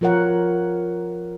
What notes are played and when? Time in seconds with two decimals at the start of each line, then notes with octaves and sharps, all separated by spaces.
0.01 F3 F4 A#4 C#5 F#5